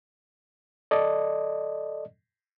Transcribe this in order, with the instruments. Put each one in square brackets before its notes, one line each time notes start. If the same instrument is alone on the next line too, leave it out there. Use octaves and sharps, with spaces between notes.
[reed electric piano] A4 D5 D#5